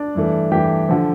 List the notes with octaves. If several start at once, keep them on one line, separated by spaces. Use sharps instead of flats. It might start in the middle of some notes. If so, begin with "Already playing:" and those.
Already playing: D4 D5
G2 E3 A3
G2 E3 A3 G4 G5
D3 F3